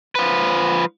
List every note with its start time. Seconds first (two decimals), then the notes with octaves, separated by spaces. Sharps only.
0.15 F3 B4